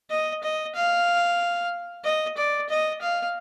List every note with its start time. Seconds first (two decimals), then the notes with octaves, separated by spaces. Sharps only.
0.10 D#5
0.43 D#5
0.75 F5
2.04 D#5
2.37 D5
2.70 D#5
3.02 F5